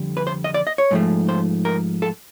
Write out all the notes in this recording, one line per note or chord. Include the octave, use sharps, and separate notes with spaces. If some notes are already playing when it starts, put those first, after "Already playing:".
Already playing: F2 D3 G3
B4
C5
D#5
D5
D#5
C#5
G#2 F3 A3
C5
A#4
A4